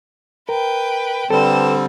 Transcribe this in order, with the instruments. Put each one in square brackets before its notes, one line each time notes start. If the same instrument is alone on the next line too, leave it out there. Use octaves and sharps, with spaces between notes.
[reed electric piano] A#4 [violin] B4 G5
[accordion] D3 G3 C4 [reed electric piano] A4 B4 [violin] C5 E7